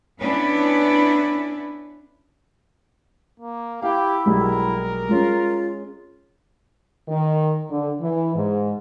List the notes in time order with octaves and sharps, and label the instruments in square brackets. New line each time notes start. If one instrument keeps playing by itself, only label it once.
[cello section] B3 C#4 D4 E4 B4
[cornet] A#3
[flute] E4 [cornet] G4 [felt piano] F5
[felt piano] B1 G3 G#3 [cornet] A#4
[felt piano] G#3 C#4 [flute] F4
[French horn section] D#3
D3
E3
G#2